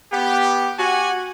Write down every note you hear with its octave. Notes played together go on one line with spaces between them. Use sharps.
B3 G4
F#4 G4 F#5 G#5